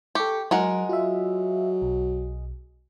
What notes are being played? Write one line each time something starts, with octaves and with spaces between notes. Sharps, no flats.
G4 A4 C#6
F#3 G#3 A#4 F#5
F#3 F4 E5
B1